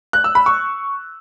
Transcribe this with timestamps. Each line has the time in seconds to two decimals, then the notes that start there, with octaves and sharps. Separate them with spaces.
0.13 F#6
0.24 E6
0.35 B5
0.46 C#6